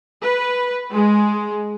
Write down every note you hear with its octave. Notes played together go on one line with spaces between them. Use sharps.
B4
G#3